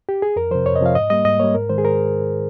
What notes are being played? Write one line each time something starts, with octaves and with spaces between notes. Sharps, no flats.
G4
G#4
F2 A#4
C3 F3 C5
F2 C#5
D#5
C3 F3 F5
G#2 D#5
G3 A#3 D#5
G#2 D#5
G3 A#3 C#5
G#2 A#4
D#3 G#3 C5
G#4
A#4